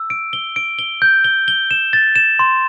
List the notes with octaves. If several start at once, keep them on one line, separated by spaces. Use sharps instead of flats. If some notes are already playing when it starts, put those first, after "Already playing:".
Already playing: E6
D7
G7
D7
G7
G6
G7
G7
E7
A6
E7
C6